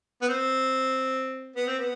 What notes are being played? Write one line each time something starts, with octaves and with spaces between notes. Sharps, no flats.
B3
C4
B3
C4
B3